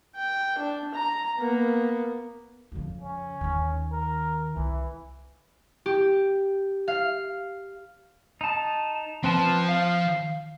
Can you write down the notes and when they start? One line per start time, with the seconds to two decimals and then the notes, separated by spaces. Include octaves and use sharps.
0.16 G5
0.58 D4
0.94 A#5
1.39 A#3 B3
2.72 F2 C#3
3.01 C#4
3.41 D#2 D#3
3.92 A#4
4.56 C2 E3
5.86 G4
6.88 F5
8.41 D#4 A5
9.24 F3 C4 B4 A5
9.69 F5